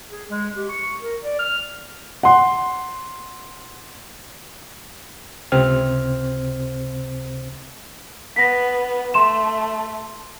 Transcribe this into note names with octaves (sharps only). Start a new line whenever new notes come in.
G#4
G#3
G4
C#6
A#4
D5
F6
F#5 C6
C#2 C3 C4 C5 F6
B3 A#6 B6
A3 C6 E7